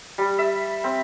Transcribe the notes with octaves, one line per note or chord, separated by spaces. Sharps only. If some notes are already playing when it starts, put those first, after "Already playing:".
G3
E5
C4